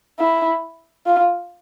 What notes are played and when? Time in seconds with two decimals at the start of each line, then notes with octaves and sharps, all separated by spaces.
0.20 E4
1.06 F4